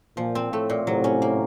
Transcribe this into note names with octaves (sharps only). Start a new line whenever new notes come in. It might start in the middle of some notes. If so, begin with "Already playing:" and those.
A#2 F3
C4
A2 A3
A#2
A2 C3 F#3
C#4
A#3